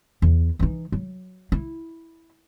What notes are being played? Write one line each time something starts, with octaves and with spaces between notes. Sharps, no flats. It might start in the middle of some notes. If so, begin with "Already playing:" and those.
E2
E3 D#4
F#3
E4